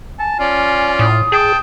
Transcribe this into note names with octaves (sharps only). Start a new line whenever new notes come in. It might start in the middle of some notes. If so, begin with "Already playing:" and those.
G#5 A5
C#4 F4 D5
A2 D#6
G#4 G5 A5